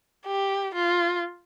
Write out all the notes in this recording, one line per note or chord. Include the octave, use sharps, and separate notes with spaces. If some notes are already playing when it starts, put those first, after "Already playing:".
G4
F4